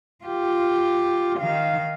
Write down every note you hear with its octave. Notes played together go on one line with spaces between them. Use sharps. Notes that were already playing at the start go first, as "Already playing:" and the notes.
F4 G4
D#3 F5